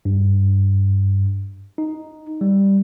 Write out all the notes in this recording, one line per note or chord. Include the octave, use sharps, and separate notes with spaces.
G2
D#4
G3